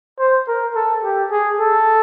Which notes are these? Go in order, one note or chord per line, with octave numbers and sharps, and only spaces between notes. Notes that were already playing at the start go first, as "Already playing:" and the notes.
C5
A#4
A4
G4
G#4
A4